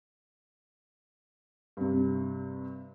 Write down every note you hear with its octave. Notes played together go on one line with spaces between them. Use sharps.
G2 C3